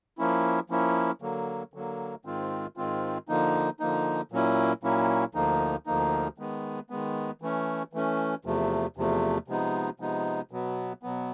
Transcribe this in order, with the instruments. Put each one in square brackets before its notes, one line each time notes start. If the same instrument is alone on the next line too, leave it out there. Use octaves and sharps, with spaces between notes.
[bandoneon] F3 A#3 C#4 E4
F3 A#3 C#4 E4
D3 F#3 A#3
D3 F#3 A#3
G#2 D#3 G#3 C4 F4
G#2 D#3 G#3 C4 F4
D3 F3 A#3 D#4
D3 F3 A#3 D#4
A#2 F#3 A#3 C#4 E4
A#2 F#3 A#3 C#4 E4
D2 D3 F3 A#3 D#4
D2 D3 F3 A#3 D#4
D#3 G#3 B3
D#3 G#3 B3
E3 A3 C#4
E3 A3 C#4
E2 C3 F3 A3
E2 C3 F3 A3
C3 F3 G#3 B3 D#4
C3 F3 G#3 B3 D#4
B2 F#3 B3
B2 F#3 B3